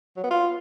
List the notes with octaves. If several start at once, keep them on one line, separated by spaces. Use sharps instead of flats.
F#3
B3
F4